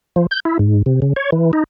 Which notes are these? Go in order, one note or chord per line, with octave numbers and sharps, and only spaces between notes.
F3
G6
E4
G#2
C3
C#3
C#5
E3
D#4